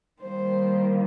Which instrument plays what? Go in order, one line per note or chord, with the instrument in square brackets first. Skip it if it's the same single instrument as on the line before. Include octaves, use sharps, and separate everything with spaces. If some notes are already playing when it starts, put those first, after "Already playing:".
[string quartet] D#3 G3 A#3 C5